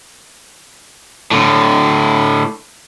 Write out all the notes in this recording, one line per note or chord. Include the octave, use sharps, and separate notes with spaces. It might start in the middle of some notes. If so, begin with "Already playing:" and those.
A2 D3